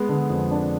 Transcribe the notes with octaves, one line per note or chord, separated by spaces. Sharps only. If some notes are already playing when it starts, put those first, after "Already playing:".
Already playing: G#3 B3
D3
F2
D4